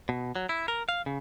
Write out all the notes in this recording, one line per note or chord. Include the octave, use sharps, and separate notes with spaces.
B2
F#3
E4
A#4
F5
C#3